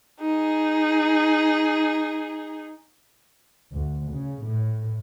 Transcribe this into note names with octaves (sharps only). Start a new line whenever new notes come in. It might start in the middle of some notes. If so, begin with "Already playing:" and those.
D#4 G#4
D2
C#3
A2